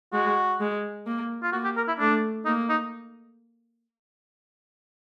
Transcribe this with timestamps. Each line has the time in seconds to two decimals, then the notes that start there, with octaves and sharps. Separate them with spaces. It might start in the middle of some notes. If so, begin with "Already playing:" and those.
0.13 G#3 F#4
0.60 G#3
1.06 A#3
1.43 F4
1.52 A#3 F#4
1.64 G4
1.77 A#4
1.88 E4
1.99 A3 D4
2.45 A#3 D#4
2.69 D#4